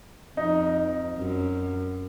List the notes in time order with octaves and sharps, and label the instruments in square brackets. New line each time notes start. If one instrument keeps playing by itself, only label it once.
[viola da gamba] F2 [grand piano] D#4
[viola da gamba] F#2